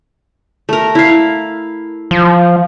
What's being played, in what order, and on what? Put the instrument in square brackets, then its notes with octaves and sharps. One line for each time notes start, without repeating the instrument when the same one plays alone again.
[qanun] A3 A#4
E4 F5
[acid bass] F3